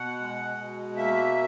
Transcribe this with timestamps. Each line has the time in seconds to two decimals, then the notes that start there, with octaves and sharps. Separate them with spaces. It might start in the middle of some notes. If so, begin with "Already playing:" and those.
Already playing: B2 F#5
0.20 G#3
0.58 B2
0.97 A#3 E5